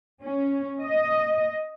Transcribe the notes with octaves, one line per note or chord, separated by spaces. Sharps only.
C#4
D#5